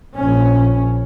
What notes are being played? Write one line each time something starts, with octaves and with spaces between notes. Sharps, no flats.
A#1 C#4